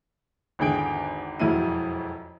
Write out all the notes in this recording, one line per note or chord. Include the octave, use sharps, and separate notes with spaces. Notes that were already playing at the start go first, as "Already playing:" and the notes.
G#1 E2 D3 G#4 G5 D7
E1 F2 F#3 E4 D#7